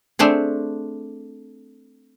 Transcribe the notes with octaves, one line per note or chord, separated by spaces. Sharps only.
A3 C4 D4 G#4